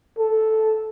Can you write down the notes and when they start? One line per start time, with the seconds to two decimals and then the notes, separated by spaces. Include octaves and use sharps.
0.18 A4